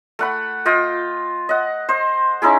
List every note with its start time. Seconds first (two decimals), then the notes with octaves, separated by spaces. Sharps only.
0.19 A3 F#5 B5
0.65 F4 D#5 G5
1.49 D#5 F#5
1.89 C5 D#5
2.42 C#4 D#4 E4 G#4